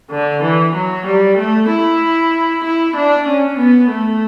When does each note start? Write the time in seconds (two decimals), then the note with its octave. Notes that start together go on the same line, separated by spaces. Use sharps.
0.11 D3
0.43 E3
0.75 F#3
1.06 G3
1.38 A3
1.69 E4
2.64 E4
2.96 D4
3.28 C#4
3.59 B3
3.91 A3